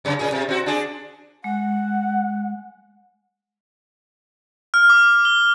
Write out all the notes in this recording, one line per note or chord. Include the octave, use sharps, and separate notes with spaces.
F#2 C#3
A#2 G#4
C3
C4 F#4
D4 G#4
G#3 F#5
F6
D6
G7